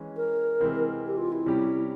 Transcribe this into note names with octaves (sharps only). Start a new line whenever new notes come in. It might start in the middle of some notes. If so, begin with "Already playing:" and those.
Already playing: E3 G#3 C#4
A#4
C3 E3 G#3 C4 E4
G4
F4
E4
C3 G3 C#4 G4